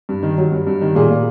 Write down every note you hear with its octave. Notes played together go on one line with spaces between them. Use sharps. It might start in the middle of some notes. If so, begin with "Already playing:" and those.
G2
D#3
F#3
G2
G2
D#3
A#2 G#4
A#2